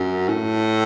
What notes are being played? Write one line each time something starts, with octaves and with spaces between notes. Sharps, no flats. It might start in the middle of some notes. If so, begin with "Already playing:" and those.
Already playing: F#2
A2